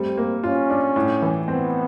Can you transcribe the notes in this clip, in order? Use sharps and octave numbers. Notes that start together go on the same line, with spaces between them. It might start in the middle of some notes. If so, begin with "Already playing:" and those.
Already playing: G3 A3 C4
A#3
C#4 F4
D4
A2
E3
B3 C4